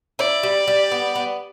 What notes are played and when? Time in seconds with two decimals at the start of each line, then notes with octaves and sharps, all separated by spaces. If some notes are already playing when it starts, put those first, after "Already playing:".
0.19 E4 D5
0.43 G3
0.68 G3
0.92 B3
1.16 B3